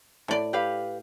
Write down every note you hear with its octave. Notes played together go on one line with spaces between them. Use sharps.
A2 D5
G4 B4 F5